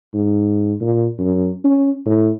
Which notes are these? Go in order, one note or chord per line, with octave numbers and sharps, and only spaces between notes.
G#2
A#2
F#2
C#4
A2